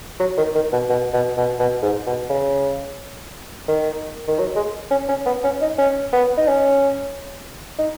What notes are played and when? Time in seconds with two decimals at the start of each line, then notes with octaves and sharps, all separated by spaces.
0.20 F#3
0.37 D#3
0.55 D#3
0.72 B2
0.89 B2
1.14 B2
1.37 B2
1.60 B2
1.83 G#2
2.06 B2
2.29 C#3
3.68 D#3
4.28 D#3
4.39 F#3
4.56 G#3
4.91 C#4
5.09 C#4
5.26 B3
5.44 C#4
5.61 D#4
5.78 C#4
6.12 B3
6.38 D#4
6.48 C#4
7.79 D#4